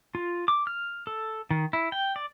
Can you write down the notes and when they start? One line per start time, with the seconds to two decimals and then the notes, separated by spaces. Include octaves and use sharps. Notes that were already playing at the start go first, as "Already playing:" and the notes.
0.15 F4
0.48 D6
0.67 F6
1.07 A4
1.51 D#3
1.73 E4
1.92 G5
2.16 D5